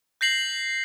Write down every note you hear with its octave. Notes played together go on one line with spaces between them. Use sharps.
G6 A#6 C7 F#7